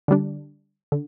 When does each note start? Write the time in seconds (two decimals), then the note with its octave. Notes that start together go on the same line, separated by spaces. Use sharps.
0.08 D3 G3 D4
0.92 D3